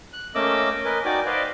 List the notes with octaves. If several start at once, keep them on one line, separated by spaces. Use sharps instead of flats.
F#6
A3 A#3 C#4 D#5 D6 E6
A#4 B4 D#5 G#5
D#4 F#4 D5 G5 G#5 D6
B4 C5 D5 D#5 F5